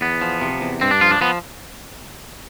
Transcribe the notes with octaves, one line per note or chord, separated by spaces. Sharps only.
E2 B3
F3
C3
E2
G2 C4
D4
F3 F4
D4
F3 B3